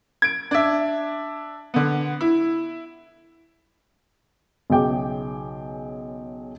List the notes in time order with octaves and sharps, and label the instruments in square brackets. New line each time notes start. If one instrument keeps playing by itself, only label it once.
[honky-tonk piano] G#6 D7
D4 E5
D3 B3
E4
[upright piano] B1 C#3 G#4 G5 D6